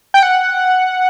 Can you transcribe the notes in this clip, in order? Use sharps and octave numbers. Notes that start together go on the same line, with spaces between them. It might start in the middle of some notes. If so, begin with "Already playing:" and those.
G5
F#5